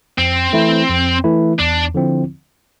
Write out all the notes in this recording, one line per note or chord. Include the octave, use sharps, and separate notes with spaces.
F2 C4
E3 A3 E4
F2
E3 A3 E4
E2 D4
D3 F3 C4 E4